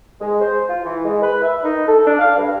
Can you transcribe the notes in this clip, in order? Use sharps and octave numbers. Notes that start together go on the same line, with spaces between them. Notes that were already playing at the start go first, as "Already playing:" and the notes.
G#3
C5
F4
E3
G#3
B4
E5
D#4
A4
D4
F5
G2